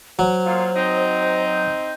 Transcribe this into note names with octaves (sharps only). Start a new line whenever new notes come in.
F#3 C5
A#2 F4
C4 D#4